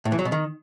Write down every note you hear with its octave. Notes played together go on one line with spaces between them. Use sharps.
A2
E3
F#3
B2
D#3